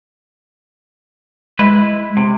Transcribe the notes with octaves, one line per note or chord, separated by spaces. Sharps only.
G#3 E4 B4
C3